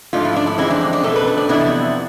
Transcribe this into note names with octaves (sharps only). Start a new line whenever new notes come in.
G#2 F3 A3 D4 F4
E4
D4
E4
F2 E3 G#3 C4 E4
D4
D4
D4
B2 A3 C4 A4
B4
D4
D4
F2 C3 E3 B3 D4 E4